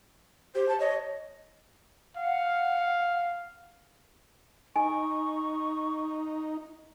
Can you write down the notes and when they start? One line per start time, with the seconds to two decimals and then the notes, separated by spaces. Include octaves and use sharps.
0.55 G4 C5
0.69 A5
0.80 C#5 D#5
2.16 F5 F#5
4.76 D#4 G#5 C#6